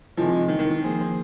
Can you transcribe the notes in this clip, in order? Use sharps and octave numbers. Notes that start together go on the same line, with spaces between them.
C3 D#3 F3 G#3
D#3
D#3
D#3
F3 A#3 G#4 C5